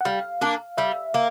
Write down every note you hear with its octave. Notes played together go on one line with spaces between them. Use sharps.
F#5
G3 F5
A#3 D4
G3 E5
A#3